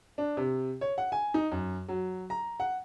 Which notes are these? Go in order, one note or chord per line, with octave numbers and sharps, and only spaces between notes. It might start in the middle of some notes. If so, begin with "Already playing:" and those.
D4
C3
C#5
F#5
G#5
D#4
F#2
F#3
A#5
F#5